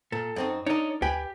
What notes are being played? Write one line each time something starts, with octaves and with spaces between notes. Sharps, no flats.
A#2 A4
F#2 C4 D#4
D4 D#4 A#4 C#5 D#5
D2 G4 B4 G5 G#5